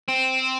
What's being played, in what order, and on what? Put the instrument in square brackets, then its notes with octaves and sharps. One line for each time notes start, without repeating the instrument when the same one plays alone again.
[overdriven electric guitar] C4